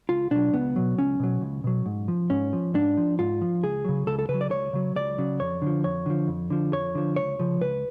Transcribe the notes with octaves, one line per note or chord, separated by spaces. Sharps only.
C#2 F4
B2 F#3 D4
C#2 B3
B2 F#3
C#2 C#4
B2 F#3
C#2
B2 F#3
G#2
F3
G#2 C#4
F3
G#2 D4
F3
G#2 F4
F3
C#2 G#4
C#3 F#3
C#2 A4
A4
C#3 B4
F#3
D5
C#2 C#5
C#3 F#3
C#2 D5
C#3 F#3
F2 C#5
D3 F3
F2 C#5
D3 F3
F2
D3 F3
F2 C#5
D3 F3
C#2 C#5
C#3 F3
C#2 B4